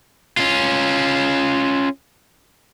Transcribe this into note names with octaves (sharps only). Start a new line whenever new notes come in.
C#4 F4